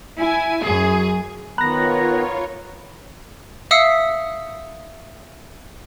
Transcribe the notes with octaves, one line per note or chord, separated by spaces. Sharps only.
E4 G#5
F#2 G#4
D#3 B3 F4 C#5 A#5 B5 F#6 A#6
E5 F5 D#6 E6 B6 C#7